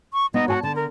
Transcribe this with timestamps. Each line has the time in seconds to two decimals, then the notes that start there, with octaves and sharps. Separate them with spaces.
0.13 C#6
0.34 B3 D#4 D#5
0.48 F#4 C#5 G#5 A5
0.63 D3 A5
0.76 A#4